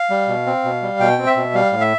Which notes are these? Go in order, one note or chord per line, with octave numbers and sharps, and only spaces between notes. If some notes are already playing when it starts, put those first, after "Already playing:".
Already playing: F5
G3
B2
C4
B2
G3
B2 G5
C4
E5
B2
G3 F5
A2
E5